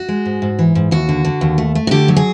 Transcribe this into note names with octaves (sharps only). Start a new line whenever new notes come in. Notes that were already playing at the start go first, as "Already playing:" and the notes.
Already playing: F#4
G#3
G#2
G#2
E3
G#2
D#2 F#4
D3
D3
D#2
A3
A3
F#4
D3 G4
F#3
G#4